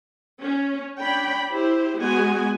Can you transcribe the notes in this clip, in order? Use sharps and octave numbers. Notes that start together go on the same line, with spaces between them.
C#4
D4 C#5 G5 B5
E4 G4 C5
G#3 B3 F#4 G#5